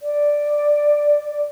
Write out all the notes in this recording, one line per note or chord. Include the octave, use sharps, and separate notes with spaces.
D5